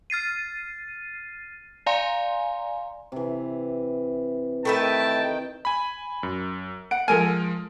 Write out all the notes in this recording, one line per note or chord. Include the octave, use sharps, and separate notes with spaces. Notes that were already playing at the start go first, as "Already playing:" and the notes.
F6 A6 C7 D#7
D5 F5 G#5 A#5 C6
C3 E3
D#3 A3 B4 E5 G5 A5
G#5 B5
F#2
F#5 D7
F3 G#3 A4 A#4 G#5 F6